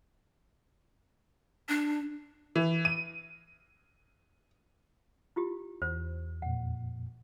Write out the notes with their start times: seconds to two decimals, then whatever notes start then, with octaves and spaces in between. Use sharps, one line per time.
1.69 D4
2.56 E3
2.85 D#7
5.36 E4 F4 G4
5.82 E2 C5
6.42 F2 A#2 F#5